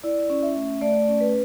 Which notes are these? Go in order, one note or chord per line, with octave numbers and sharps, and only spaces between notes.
E4 D5
C#4
E5
A3
A3 D5
C#4
B4